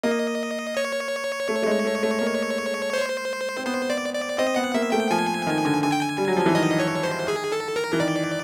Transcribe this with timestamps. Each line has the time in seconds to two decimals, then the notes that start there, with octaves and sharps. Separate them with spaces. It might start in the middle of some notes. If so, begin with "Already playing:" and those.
0.03 A#3 D#5
0.77 C#5
1.49 A3
1.63 A3
1.66 G#3
1.85 A3
2.03 A3
2.21 A#3
2.93 C5
3.57 C4
3.66 B3 C5
3.90 D5
4.14 D5
4.38 C4 D#5
4.56 B3 F#5
4.74 A#3 E5
4.92 A3 G5
5.11 F3 G#5
5.47 D#3
5.65 D3
5.83 D3 G#5
5.92 G5
6.01 G#5
6.18 G3
6.28 F#3
6.37 F3
6.46 E3
6.55 D#3 D#5
6.80 C#5
7.03 C5
7.28 G#4
7.52 A4
7.76 A#4
7.93 E3
8.00 D#3 D5